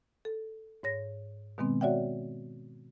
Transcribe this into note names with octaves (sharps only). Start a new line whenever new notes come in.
A4
G#2 C#5 A#6
B2 D#3 G#3 B3 C4
F#4 C#5 D5 E5 F#5 G5